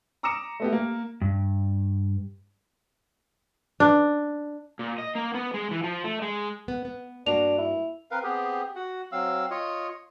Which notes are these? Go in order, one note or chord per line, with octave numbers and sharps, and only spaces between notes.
A#5 D6 D#6 A#6 C#7 E7
A3 B3 G4
A#3
G2
D4
A#2
D#5
A#3
B3
G#3
E3
F3
A3
G#3
B3
B3
G2 A#3 D4 F#4 F7
E4
C4 A#4 B4 F5
B3 C4 G4 G#4
F#4 F#5
F#3 C4 F5 E6
F4 C#5 D#5